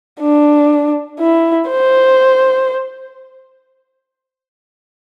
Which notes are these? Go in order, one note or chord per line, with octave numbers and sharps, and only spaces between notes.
D4
E4
C5